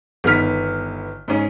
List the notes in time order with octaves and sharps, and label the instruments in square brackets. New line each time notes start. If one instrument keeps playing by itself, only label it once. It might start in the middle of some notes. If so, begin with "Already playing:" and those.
[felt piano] G1 D#3 B3 F6 B6
G#2 C#4